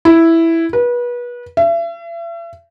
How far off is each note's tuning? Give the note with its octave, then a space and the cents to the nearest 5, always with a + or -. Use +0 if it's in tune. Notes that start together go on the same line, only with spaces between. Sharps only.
E4 +0
B4 -30
E5 +40